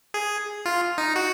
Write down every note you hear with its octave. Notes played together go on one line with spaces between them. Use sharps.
G#4
F4
D#4
F#4